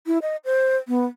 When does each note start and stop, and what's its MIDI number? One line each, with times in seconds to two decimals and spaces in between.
0.07 0.18 64
0.22 0.36 75
0.45 0.77 72
0.88 1.04 59